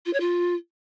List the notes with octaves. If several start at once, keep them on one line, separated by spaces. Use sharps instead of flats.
F4
C#5
F4